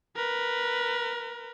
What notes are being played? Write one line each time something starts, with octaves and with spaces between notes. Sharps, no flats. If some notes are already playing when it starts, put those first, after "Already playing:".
A#4 B4